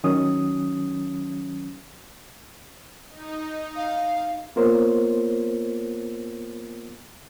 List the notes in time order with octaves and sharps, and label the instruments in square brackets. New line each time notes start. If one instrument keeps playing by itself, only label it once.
[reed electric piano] D#3 F#3 C#4 D#6
[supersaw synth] D#4
[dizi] F5
[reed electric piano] A#3 B3 F4 A#4 C5 C#5